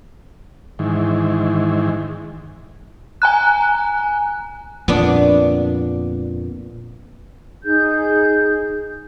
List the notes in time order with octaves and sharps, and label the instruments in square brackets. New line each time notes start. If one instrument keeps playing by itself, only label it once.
[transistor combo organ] G#2 D#3 E3
[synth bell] G#5 A#5 F#6
[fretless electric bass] F2 A#2 D3 [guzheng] B3 D4
[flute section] D#4 G#4 G6